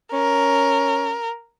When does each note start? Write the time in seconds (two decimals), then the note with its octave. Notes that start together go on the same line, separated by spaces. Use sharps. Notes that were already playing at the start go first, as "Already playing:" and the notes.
0.13 C#4 A#4